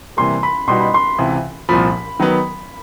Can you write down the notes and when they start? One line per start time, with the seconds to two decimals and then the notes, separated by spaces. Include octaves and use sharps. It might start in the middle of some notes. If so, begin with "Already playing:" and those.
0.17 C3 E3 G3 A#3 C6
0.43 B5
0.68 B2 G3 B3 D#4 F#4 C6
0.81 B5
0.94 C6
1.18 C#2 C3 E3
1.69 C2 A#2 F3 B5
2.20 D#3 F#3 B3